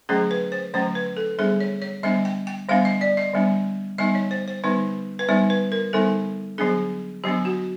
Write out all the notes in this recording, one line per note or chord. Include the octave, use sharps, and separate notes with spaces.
D3 F#3 A3 C#4 G#4
B4
C5
D3 F#3 A3 C#4 C5
B4
A4
D3 G3 B3 D4 G#4
C#5
C#5
D3 G3 B3 D4 D#5
G5
G5
D3 G3 B3 D4 F5
D#5
D5
D#5
D3 G3 B3 D4
D3 G3 B3 D#4 D#5
C#5
C5
C5
D3 G3 B3 D#4 B4
B4
D3 G3 B3 D#4 C5
B4
A#4
D3 G3 B3 D#4 A4
D3 F#3 B3 D4 G#4
D3 F#3 B3 D4 G4
F#4